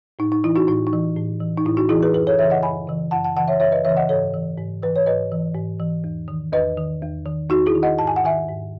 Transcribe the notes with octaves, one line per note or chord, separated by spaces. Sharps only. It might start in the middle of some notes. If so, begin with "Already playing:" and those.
A2 D#4
D#4
E3 E4
D#4 F#4
A2 D#4
D#4
E3
A2
E3
D#4
A2 E4
D#4 F#4
E3 E4 G#4
G#4 B4
F#2 G#4 B4
A4 C#5
C#3 E3 C#5 E5
D#5 F#5
F#2 G#5 B5
C#3 E3
F#2 F#5 A5
F#5 A5
C#3 E3 F#5 A5
C#5 E5
F#2 C#5 E5
B4 D#5
C#3 E3 C#5 E5
D#5 F#5
G#2 A4 C#5
E3
G#2
E3 B4
C#5
G#2 B4 D#5
E3
G#2
E3
E2
D#3
E2 B4 D#5
D#3
E2
D#3
E2 D#4 F#4
E4 G#4
D#3
D#5 F#5
G#2 A5
G#5
F#5
D#3 E5 G#5
G#2